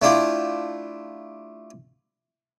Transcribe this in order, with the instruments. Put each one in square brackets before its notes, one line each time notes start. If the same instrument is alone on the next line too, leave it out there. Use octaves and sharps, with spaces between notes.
[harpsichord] A3 D4 E4 F4 G4